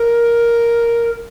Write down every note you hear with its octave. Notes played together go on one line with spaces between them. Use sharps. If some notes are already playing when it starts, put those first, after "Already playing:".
Already playing: A#4